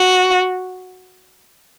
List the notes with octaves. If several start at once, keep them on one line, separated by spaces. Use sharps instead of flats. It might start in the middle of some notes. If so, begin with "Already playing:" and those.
Already playing: F#4